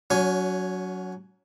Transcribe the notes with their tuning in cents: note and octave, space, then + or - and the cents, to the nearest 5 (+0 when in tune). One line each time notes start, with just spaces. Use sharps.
F#3 +0 C#4 +35 G#5 +0